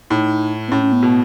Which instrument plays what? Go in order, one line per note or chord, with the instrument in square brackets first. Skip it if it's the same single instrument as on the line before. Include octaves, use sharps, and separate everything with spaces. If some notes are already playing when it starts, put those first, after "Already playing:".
[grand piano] A2 [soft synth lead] D#4
[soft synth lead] B3
[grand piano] A2 [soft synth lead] C#4
[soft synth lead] C#4
B3
[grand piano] B2